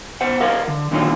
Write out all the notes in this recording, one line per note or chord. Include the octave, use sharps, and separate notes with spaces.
B2 C5 F#5
A#4 D#5 F5 F#5
D3
A#2 D3 D#3 D#4 F4 C#5